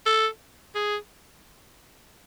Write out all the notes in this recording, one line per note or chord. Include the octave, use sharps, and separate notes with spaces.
A4
G#4